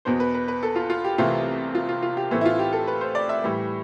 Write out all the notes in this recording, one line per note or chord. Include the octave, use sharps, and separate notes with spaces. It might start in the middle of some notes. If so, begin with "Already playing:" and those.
E2 B2 B3 C5
B4
B4
B4
A4
F4
F4
G4
C2 C3 E3 A3 C4 F4
F4
F4
F4
G4
A2 E3 A3 C4
E4
F4
G4
A4
B4
C5
D5
E5
A2 E3 G3